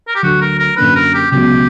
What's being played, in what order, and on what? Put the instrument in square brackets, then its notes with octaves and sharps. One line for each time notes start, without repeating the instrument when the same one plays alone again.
[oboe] A#4
G4
[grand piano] D2 D3 F#3 [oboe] F#4
[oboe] A#4
A#4
[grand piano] F#2 D3 A#3 D4 [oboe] B4
[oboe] A#4
G4
[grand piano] C#2 B2 F#3 B3 [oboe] G4